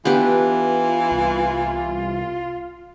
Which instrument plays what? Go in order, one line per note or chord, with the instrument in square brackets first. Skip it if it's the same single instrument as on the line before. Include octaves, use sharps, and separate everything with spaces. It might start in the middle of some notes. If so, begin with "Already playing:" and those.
[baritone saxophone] E3 [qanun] B3 D4 G4 [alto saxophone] F4
[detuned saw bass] C2